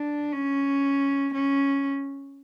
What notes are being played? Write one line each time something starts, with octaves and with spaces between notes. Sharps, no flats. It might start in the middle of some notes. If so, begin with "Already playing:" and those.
Already playing: D4
C#4
C#4